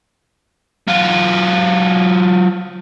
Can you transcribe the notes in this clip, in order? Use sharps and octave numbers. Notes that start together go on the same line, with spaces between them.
F#3 F4